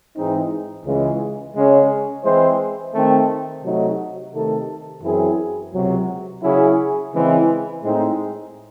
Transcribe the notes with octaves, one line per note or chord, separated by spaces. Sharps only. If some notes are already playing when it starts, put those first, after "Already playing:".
G#2 E3 G#3 C4 D#4
C#2 C#3 E3 G#3 C#4
C#3 G#3 C#4
E3 G#3 C4 E4 C5
D#3 A3 C4
C3 F#3 A3 D#4 F#4
C3 D#3 A3 D#4 A4
F#2 E3 C4 E4 G#4
C#2 C3 F#3
C#3 F#3 C#4 E4 G#4
C#3 E3 G#3 C4 E4
A2 G#3 C4 D#4